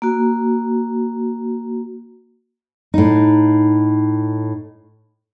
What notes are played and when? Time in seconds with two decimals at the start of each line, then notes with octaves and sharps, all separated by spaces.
0.02 A#3 F#4
2.94 A2 D#4